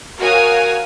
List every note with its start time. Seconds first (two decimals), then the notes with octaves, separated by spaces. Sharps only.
0.19 F#4 A#4 C#5 F5 G#5 D#6